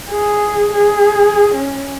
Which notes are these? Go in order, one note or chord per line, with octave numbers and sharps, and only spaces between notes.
G#4
G#4
C#4